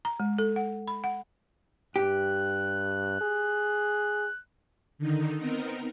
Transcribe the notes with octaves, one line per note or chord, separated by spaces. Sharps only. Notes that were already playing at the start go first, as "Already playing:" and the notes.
A#5
G#3
A4
F#5
B5
F#5
G2 G4 F#6
G#4
D3 D#3 D#4
B3 C4 D#4 A#4